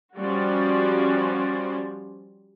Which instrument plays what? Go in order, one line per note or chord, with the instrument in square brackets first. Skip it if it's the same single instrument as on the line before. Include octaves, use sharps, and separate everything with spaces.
[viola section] F3 G3 C#4 F#4 C5 D5